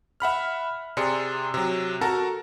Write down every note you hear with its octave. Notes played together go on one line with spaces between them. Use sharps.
E5 F#5 B5 F6
C3 G#4 D5 C6 C#7
C3 F#3
F#4 A4 A#4 A5 A#5